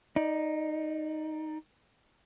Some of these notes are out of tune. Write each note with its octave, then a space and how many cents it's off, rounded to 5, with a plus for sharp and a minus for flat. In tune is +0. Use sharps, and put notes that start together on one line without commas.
D#4 +0 D5 +25